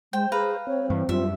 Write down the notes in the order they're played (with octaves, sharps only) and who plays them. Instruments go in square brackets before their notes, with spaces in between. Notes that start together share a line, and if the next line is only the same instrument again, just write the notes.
[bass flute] G#3 [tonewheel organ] C5 [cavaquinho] G5
[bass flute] G#4 [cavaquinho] B4 F5 A#5
[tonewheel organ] C4 [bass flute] C#5
[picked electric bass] G2 [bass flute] E3
[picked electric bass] F#2 G3 [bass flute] F4 [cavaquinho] E5